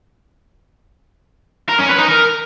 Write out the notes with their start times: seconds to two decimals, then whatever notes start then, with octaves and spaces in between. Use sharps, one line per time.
1.69 A#4
1.79 C#4
1.89 B4
1.98 D#4
2.08 A#4